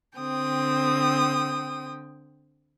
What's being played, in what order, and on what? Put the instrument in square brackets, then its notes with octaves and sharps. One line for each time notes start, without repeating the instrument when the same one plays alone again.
[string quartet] D3 C4 G5 D#6